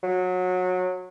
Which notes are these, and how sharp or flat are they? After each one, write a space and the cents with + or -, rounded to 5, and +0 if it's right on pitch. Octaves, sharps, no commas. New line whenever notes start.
F#3 -20